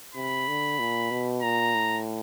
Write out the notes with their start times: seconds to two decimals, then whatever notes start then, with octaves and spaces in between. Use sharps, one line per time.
0.14 C3 B5
0.47 D3
0.79 A#2
1.11 B2
1.43 A#2 A#5
1.75 A2